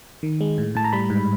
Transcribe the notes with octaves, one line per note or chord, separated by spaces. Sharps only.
D#3
G#3
A2
A2 A5
A#5
G3 B5
G#2